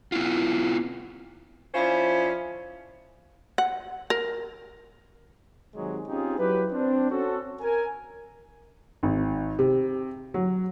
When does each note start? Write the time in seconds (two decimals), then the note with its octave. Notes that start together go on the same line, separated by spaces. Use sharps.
0.12 B3 E4 F4
1.75 F3 C#4 D4 E4 F4 C5
3.58 F#5
4.10 A#4
5.75 C3 D#3 F#3 G#3 G#4
6.07 C4 C#4 D#4 F4 G4 G#4
6.38 F#3 E4 G4 B4
6.72 C4 D4
7.10 C#4 F#4 A4
7.61 A#4 G#5
9.03 G#1
9.59 C3
10.34 F#3